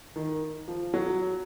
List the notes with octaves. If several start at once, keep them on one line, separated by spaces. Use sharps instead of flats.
D#3
F3
F#3